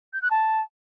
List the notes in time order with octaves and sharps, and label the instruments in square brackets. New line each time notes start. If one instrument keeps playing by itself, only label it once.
[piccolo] G6
F#6
A5